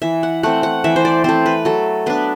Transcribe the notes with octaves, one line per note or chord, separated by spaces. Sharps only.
E3 E5
F#5
A3 C4 F#5
F#5
E3 E5
C5
D5
A3 C4 C5
B4
F#3 A4
B3 D4 B4